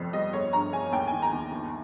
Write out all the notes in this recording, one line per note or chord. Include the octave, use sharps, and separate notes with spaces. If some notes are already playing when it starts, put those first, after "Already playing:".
Already playing: F1 F2
G3 D#5
G1 C#5
G2 A#5
G1 G#5
D#2 G5
D#3 G#5
A#5
D#2
G1